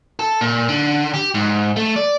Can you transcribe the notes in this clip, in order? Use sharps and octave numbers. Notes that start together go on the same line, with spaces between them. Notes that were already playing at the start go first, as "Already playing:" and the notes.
A4
A#2
D3
G4
G#2
A3
D5